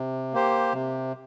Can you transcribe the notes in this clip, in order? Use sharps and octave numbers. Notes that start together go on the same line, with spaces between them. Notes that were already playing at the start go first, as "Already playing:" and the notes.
Already playing: C3
A#3 G4 C5
C3